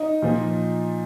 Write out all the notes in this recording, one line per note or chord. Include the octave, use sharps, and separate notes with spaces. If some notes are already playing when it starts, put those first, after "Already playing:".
Already playing: D#4 D#5
A#2 F3